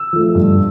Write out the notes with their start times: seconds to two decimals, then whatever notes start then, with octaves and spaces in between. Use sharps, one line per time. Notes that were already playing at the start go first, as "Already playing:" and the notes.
Already playing: E6
0.13 F3 A3
0.35 G2